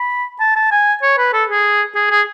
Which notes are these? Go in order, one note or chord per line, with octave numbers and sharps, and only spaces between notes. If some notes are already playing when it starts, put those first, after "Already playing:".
Already playing: B5
A5
A5
G#5
C#5
B4
A4
G#4
G#4
G#4